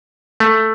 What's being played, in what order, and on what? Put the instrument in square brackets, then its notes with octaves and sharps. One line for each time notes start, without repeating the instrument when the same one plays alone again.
[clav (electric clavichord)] A3